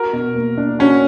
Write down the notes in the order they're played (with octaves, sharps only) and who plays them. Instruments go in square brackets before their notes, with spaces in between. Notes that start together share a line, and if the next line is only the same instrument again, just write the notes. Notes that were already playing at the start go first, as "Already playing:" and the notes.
Already playing: [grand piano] F#4 [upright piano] A#4
[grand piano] B2
A#3
D4
[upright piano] C#4 [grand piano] F#4